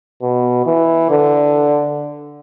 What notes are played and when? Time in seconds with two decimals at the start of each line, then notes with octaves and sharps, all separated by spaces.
0.22 B2
0.66 E3
1.10 D3